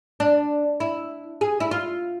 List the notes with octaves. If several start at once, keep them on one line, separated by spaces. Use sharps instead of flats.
D4
E4
G#4
E4
F4